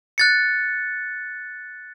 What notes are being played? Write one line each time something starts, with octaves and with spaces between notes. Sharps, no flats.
F#6 A6 C#7